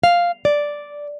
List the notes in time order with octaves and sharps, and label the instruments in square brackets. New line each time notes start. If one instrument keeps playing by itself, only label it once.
[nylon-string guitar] F5
D5